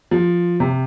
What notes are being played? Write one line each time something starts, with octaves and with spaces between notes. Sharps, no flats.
F3
C3